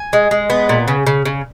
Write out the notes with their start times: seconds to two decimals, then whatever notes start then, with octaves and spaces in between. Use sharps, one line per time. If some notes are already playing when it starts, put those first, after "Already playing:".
Already playing: G#5
0.13 G#3
0.31 G#3
0.50 B3
0.69 A#2
0.88 C#3
1.07 C#3
1.25 C#3